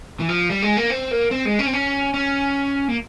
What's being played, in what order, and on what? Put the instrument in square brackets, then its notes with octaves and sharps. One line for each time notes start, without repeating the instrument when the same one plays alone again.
[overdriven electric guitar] E3
F3
G3
G#3
A#3
C4
A#3
C4
G#3
C#4
C4
C#4
C#4
A#3